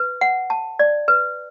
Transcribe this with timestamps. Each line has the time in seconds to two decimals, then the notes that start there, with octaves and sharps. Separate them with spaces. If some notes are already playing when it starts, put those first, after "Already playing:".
Already playing: B4
0.21 F#5
0.50 A5
0.79 D5
1.08 B4